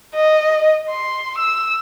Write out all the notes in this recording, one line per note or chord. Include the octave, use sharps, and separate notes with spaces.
D#5
C6
E6